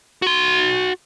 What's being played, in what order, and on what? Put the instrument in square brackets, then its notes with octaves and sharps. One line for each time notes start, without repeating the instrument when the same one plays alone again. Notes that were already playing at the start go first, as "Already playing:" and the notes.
[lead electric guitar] F#4 C6